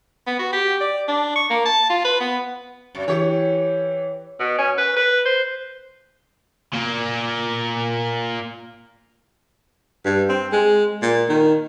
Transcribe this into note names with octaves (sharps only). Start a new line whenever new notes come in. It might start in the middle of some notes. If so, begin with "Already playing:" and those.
B3
F#4
G4
D5
D4
C#6
A#3
A5
F4
B4
B3
F#2
E3 G4 C#5
B2
C#4
B4
B4
C5
A#2 A#3
G2
C4
G#3
A#2
D#3